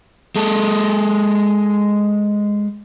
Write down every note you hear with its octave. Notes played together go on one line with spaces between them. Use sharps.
G#3 A4